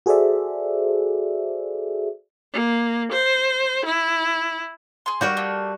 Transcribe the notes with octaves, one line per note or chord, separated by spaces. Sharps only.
F#4 G#4 A4 C5 D5 E5
A#3
C5
E4
G#4 C6
G3 F#4 A#4 C#6 G6
A3 A#3